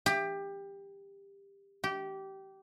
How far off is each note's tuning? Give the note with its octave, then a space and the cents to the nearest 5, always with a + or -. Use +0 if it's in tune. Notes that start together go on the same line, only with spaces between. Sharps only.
G4 +20
G4 -20